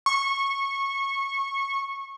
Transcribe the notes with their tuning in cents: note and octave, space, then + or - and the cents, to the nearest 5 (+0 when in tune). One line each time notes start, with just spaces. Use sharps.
C#6 -20